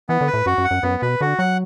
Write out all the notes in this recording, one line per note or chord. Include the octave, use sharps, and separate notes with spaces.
E3 B3
D3
B4
A2
F#2 F#4
F#2
F#5
F#2
F#2 B3
B2 B4
D3 F#4
F#3 F#5